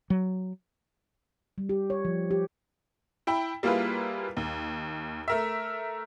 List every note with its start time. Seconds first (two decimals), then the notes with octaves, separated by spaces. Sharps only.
0.10 F#3
1.58 G3
1.69 G4
1.90 C#5
2.05 F3
2.31 G4
3.27 E4 G5 B5
3.63 G3 A#3 E4 F4 G#4 B4
4.37 D#2
5.28 A3 A#4 E5